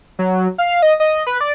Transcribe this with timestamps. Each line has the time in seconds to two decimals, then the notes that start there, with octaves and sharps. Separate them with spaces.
0.19 F#3
0.58 F5
0.82 D#5
1.00 D#5
1.27 B4
1.41 D5